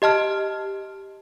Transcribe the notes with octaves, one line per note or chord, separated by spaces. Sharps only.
G4 D#5 A5 F6